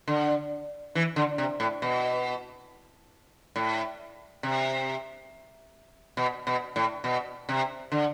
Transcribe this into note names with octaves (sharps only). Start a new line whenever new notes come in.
D3
E3
D3
C3
A2
B2
A2
C3
B2
B2
A2
B2
C3
D3